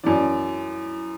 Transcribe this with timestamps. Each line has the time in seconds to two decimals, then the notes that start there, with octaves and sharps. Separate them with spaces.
0.04 F#2 E3 D5